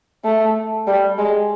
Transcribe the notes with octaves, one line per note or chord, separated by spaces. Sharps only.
A3
G3
G#3